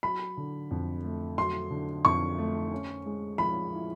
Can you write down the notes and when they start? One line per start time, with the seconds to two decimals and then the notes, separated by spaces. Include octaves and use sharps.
0.03 F#3 B5
0.37 D3
0.71 F2
1.04 A3
1.38 F#3 C6
1.71 D3
2.05 F2 C#6
2.39 A3
2.72 C#4
3.06 G#3
3.38 F3 B5
3.73 E4